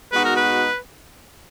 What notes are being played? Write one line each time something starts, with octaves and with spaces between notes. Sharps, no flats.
B2 G#3 D#4 F#4 B4
A#4
B4